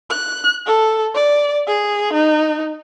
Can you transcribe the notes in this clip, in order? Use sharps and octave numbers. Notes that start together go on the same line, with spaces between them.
F#6
A4
D5
G#4
D#4